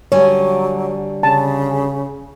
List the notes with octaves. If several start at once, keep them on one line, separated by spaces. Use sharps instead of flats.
D3 F#3 G3 C#5 G#5
C#3 A5